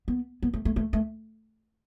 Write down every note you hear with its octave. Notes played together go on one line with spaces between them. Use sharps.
B3
B3
A3
A3
A3
A3